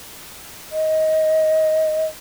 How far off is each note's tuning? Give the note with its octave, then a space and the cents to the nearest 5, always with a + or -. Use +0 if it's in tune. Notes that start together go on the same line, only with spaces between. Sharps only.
D#5 +15